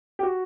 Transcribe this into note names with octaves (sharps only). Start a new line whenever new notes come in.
G4
F#4